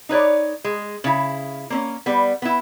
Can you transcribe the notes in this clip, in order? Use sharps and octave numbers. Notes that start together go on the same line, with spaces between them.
D#4 B4 C#5 D5
G#3
C#3 E4
A#3 C4 C#4
G3 B3
B3 E4